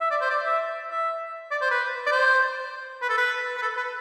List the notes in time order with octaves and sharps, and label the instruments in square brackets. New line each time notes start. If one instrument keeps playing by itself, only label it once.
[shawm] E5
D5
C5
D5
E5
E5
D5
C5
B4
D5
C5
B4
A4
B4
B4
A4
B4